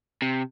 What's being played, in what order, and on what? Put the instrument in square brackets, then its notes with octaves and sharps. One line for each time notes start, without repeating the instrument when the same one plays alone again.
[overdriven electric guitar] C3